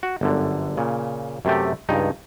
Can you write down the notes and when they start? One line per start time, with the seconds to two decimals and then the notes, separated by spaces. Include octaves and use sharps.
0.03 F#4
0.21 G1 F#2 D3
0.77 A#2 C#3
1.45 F#2 C3 A3 G4
1.89 C#2 G2 D#4